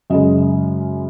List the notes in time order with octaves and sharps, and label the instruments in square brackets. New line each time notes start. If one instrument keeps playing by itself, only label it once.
[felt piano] F#2 C#3 G#3 D#5